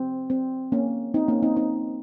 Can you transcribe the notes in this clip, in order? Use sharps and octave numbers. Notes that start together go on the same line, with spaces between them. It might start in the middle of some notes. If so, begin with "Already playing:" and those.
Already playing: C4
C4
A#3 C#4
C4 D#4
A#3 C#4
C4 D#4
C4 D#4